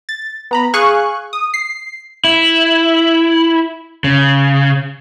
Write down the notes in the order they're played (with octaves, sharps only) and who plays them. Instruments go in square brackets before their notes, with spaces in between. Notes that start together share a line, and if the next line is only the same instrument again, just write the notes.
[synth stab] A6
B3 A#5 B5
G#4 F5 G#5 C#6 F#6
D#6
C7
[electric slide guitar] E4
C#3